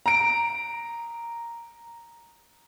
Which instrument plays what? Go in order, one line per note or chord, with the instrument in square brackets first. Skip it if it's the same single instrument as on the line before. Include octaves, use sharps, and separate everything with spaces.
[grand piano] A#5 D7